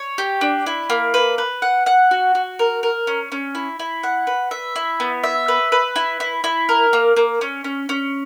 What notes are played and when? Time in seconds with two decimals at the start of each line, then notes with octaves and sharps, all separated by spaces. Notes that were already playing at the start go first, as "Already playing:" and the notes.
Already playing: C#5
0.18 G4
0.41 D4
0.66 E4
0.90 A#3
1.14 B4
1.38 B4
1.62 F#5
1.86 F#5
2.11 F#4
2.35 F#4
2.59 A#4
2.83 A#4
3.07 C#4
3.32 C#4
3.55 E4
3.79 E4
4.03 F#5
4.27 B4
4.51 E5
4.76 E4
5.00 B3
5.24 E5
5.48 B4
5.72 B4
5.96 E4
6.20 E4
6.44 E4
6.69 A#4
6.93 A#3
7.17 A#3
7.41 C#4
7.64 C#4
7.89 C#4